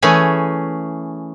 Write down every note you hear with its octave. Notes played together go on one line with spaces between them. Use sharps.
E3 A3 C#4 G#4